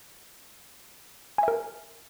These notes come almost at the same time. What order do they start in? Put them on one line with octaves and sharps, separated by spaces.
G#5 E5 A#4